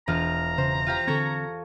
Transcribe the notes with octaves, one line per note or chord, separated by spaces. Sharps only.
E1 F4 A#5 F6
C#3 C5
F4 G4 F5
D3 C4 A4 C#6 G#6